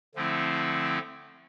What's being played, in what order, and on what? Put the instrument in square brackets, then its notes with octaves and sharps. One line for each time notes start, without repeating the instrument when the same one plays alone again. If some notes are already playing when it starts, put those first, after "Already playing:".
[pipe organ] D3 F3 A3 C4 E4